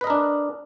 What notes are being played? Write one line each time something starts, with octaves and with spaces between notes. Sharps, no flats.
D4 A#4 B4 D#5